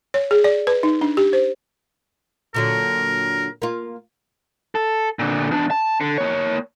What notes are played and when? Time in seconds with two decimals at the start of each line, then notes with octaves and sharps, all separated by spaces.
0.14 C#5
0.31 G#4
0.44 D5
0.67 B4
0.83 D#4
1.01 D4
1.17 G4
1.33 C5
2.54 A#2 D3 F#3 A#4
3.62 A#3 F4
4.75 A4
5.19 A#2 D3
5.51 E2 D4
5.71 A5
6.01 D3
6.18 A#3 C#5